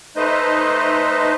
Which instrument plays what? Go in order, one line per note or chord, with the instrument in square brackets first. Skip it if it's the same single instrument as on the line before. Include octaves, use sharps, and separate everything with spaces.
[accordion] A3 D#4 B4 C5 D#5